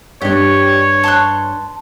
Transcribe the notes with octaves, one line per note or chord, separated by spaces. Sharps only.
G2 D4 G4 C#5
A5 C6 F#6